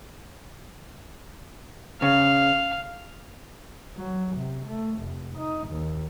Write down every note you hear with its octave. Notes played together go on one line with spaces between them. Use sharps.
C#3 F5
F#3
C3
A3
F1
D#4
D#2